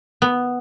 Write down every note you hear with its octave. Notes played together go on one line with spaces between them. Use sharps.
B3